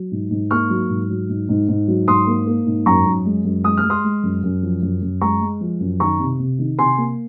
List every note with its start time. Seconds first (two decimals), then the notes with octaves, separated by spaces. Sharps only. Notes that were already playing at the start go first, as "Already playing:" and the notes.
Already playing: F#3
0.11 G#2
0.31 G#2
0.51 A#3 C#6 F6
0.70 F#3
0.89 G#2
1.10 F#3
1.29 G#2
1.49 G#2
1.68 G#2
1.88 F#3
2.08 G#2 C6 D#6
2.27 A#3
2.47 A#3
2.66 G#2
2.86 F#2 A#5 C#6
3.06 F#2
3.26 G#3
3.45 F#2
3.64 G#3 D#6
3.77 F6
3.84 G#3
3.90 C6 D#6
4.04 G#3
4.23 F#2
4.43 F#2
4.63 F3
4.82 F#2
5.02 F#2
5.21 G#3 A#5 C#6
5.41 G#3
5.61 F3
5.80 F#2
6.00 D#3 A#5 C#6
6.19 C3
6.39 C3
6.59 D#3
6.78 C3 G#5 C6
6.98 A#3